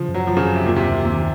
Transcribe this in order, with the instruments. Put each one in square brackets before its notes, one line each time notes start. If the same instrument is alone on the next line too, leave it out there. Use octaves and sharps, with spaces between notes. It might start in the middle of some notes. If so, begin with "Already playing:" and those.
Already playing: [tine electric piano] C#3 [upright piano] F3
[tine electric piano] F#2
[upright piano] F#3
[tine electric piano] G#1 [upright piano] F3
[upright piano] C#3
[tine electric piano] F#2
[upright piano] C3
[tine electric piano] D#2 [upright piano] A#2
[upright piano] C3
[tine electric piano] D#2
[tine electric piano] D#2 [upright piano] C3